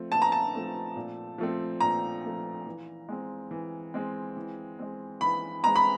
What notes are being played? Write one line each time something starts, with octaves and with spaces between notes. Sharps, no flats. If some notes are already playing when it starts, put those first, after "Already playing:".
Already playing: F3 A3 C4
A#2 A5
A#5
A5
F3 A3 C4
A#2
F3 A3 C4
A#2 A#5
F3 A3 C4
E3
G#3 C4
E3
G#3 C4
E3
G#3 C4
E3 B5
G#3 C4 A#5
B5